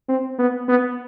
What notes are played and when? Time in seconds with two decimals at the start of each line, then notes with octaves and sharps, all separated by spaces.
0.09 C4
0.39 B3
0.68 B3